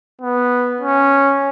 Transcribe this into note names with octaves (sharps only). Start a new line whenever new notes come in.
B3
C#4